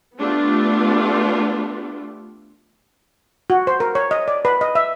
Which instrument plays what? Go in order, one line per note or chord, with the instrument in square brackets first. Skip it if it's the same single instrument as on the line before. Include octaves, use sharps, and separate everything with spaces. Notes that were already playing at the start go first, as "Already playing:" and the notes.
[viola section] A3 B3 D4 F4 G4
[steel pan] F#4
C5
A#4
C#5
D#5
D5
B4
D#5
E5